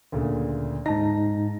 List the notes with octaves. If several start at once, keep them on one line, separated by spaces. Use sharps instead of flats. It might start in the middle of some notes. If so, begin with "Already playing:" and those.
D2 A#2 C#3
G#2 D#4 A5 A#6